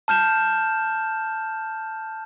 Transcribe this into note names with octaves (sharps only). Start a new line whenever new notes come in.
A5 F6 G6 E7